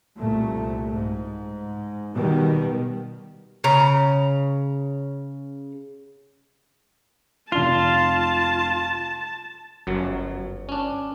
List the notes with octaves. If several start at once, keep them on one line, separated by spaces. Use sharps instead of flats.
C2 A#2 A3
G#2
B2 D#3 G3 B3
C#3 A#5
F1 D4 F4 A5 G7
G1 F#2 F#3
C#4 D4